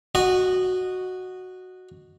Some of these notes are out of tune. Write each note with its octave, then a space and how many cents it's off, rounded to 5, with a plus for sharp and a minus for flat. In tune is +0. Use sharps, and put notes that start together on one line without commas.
F#4 -5 D#5 -15